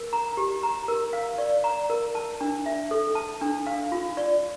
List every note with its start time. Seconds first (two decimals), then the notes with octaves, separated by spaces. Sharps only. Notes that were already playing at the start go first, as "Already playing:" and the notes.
Already playing: A#4
0.13 A#5
0.37 G4
0.63 A#5
0.88 A#4
1.13 F5
1.38 D5
1.64 A#5
1.90 A#4
2.15 A5
2.41 D4
2.66 E5
2.91 A4
3.15 A5
3.41 D4
3.67 F5
3.92 F4
4.17 D5